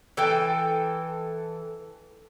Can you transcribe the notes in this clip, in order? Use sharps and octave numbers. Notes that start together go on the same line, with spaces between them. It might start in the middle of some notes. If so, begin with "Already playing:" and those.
E3 A4 G5